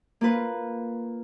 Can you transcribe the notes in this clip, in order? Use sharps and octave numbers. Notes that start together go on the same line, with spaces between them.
A#3 F4 B4